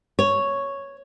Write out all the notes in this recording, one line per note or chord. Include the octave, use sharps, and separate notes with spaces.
C#5